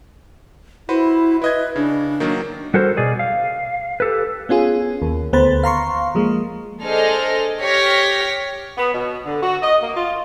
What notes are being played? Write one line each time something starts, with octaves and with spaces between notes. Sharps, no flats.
E4 F#4 B4 C5
E4 B4 D#5 G#6
C#3 D4
D#3 F#3 A#3
G3 F#4 A4 A#4 C5
B2 G#4 D5 D#5
F5
G4 A4 B4
B3 C#4 F4 G#4
D#2
D2 B3 C5 B5 A6
F5 A#5 C6 C#6
F3 G#3 A#3
D4 G#4 A4 C5 D#5 F6
G4 C#5 F6 A#6 B6
B3
B2
D3
F#4
D#5
A#3
F4